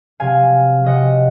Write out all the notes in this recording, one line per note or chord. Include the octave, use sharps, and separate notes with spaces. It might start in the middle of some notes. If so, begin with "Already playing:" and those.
C3 F#3 F5 G#5
C3 F#3 D#5 F#5